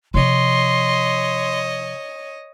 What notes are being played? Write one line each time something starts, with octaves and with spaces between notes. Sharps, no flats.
C3 F3 C#5 D#5 C6